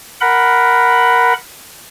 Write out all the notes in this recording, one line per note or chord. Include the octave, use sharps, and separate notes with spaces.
A#4 F#5 B5